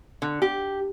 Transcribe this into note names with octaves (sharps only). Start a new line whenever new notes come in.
D3
G4